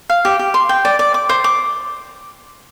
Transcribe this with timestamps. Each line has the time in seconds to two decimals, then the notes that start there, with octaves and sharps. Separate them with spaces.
0.09 F5
0.25 G4
0.39 G4
0.54 C6
0.69 G5
0.85 D5
0.99 D5
1.14 D6
1.29 C5
1.44 D6